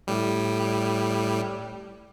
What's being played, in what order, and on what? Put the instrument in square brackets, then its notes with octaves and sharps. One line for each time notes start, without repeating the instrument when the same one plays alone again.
[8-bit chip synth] A2 G3